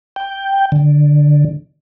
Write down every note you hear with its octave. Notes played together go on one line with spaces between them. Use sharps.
G5
D3